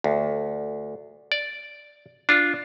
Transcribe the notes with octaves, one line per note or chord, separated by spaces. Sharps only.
D2
D5
D4 F4